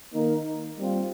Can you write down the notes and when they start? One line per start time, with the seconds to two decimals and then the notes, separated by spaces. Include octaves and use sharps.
0.13 D#3 A#3 D#4 A#4
0.78 G3 C4 F4